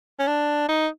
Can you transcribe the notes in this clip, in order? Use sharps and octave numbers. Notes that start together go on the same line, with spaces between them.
C#4
D4
D#4